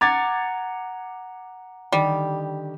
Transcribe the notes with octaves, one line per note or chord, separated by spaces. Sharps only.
F#5 A#5 D6 G#6 A6
D3 D#3 G3 G4